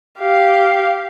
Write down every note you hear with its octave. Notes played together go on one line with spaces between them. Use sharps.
G4 F5